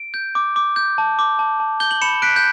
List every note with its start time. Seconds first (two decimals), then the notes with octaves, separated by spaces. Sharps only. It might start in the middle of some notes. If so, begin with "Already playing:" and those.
Already playing: D7
0.14 G6
0.35 D6
0.56 D6
0.76 G6
0.98 A5
1.19 D6
1.39 A5
1.60 A5
1.80 G6 G7
1.91 F#7
2.02 B5 C#7 E7
2.22 F#6 B6 D7
2.36 G6